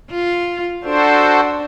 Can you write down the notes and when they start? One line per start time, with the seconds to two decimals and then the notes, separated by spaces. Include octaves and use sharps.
0.10 F4
0.84 D4 F#4 A4 C5